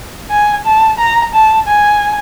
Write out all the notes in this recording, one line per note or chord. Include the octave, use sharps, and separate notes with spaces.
G#5
A5
A#5
A5
G#5